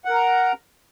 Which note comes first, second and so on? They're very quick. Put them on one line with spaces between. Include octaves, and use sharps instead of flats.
F#5 A#4 A#5